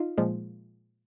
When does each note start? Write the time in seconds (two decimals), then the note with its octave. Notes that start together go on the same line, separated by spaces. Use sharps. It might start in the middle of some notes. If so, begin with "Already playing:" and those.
Already playing: D#4 F4
0.18 A#2 F3 G#3